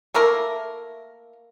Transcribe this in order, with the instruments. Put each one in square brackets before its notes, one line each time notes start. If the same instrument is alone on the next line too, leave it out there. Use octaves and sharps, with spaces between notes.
[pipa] A3 A#3 E4 A#4